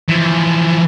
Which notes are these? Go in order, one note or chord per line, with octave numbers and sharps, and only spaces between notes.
E3 F3